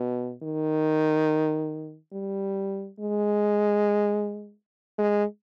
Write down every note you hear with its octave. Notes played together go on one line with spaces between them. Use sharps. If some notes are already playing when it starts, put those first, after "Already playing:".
Already playing: B2
D#3
G3
G#3
G#3